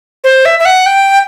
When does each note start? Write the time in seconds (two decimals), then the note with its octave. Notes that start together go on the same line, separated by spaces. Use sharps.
0.24 C5
0.45 E5
0.60 E5
0.65 F#5
0.86 G5